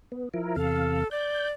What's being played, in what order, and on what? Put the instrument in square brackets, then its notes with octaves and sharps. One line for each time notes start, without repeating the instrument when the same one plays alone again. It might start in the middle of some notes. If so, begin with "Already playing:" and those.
[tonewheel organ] B3
F3 E4 A#4
[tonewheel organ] E2 C3 F5 [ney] A4
[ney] D5 [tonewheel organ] G6